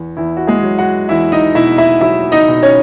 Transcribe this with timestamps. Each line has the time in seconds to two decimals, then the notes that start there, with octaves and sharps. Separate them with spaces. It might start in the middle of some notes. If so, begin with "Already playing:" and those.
Already playing: E2
0.17 E2 E4
0.37 F#4
0.47 G#3 G#4
0.63 F#3
0.79 F#4 F#5
1.09 E2 E4 E5
1.32 D#4 D#5
1.55 B2 E4 E5
1.78 E4 E5
2.01 F#3 E4 E5
2.32 D#4 D#5
2.48 B2
2.63 C#4 C#5